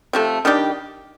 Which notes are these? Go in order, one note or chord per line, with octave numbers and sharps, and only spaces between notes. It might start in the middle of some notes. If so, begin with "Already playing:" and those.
C3 F3 A3
D#3 G3 D4 G4